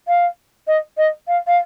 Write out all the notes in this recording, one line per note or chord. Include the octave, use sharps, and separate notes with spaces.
F5
D#5
D#5
F5
F5